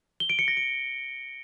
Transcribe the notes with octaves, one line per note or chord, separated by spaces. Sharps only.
G7
D7
C#7
A#6
D7